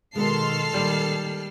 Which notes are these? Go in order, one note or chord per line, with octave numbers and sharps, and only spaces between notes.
B2 D#3 G#3 A4 C6 F6 C7
A#2 D#3 G3